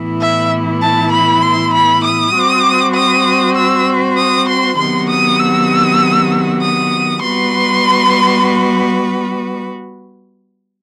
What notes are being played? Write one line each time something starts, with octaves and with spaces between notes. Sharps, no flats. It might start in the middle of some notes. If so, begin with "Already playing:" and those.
Already playing: A2 E3 B3 E4
E5
A5
B5
C6
B5
D#6
G3 C4 F#4 C5
D#6
E6
D#6
C6
C3 D#3 F#3 B3 F#4 C6
D#6
E6
D#6
G3 B3 F#4 B4 C6